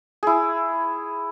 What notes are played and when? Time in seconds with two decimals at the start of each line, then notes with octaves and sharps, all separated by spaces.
0.23 E4 G#4